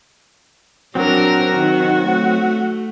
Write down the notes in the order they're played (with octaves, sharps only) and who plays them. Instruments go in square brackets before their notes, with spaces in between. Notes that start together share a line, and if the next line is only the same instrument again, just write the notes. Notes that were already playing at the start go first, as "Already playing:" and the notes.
[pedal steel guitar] F#3 C4 [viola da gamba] D4 A#4 [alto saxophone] F#4
[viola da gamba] D#3
A3